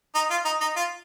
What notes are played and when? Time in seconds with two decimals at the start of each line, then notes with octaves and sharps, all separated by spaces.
0.15 D#4
0.30 F4
0.45 D#4
0.61 D#4
0.76 F4